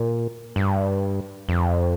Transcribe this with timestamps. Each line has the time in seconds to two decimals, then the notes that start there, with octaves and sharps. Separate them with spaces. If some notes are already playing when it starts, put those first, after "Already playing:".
Already playing: A#2
0.56 G2
1.49 F2